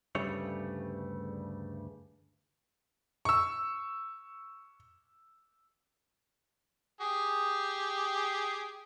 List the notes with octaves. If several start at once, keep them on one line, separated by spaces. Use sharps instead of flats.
D2 G2 C#3 G3 A3 C#5
C#6 E6
G4 G#4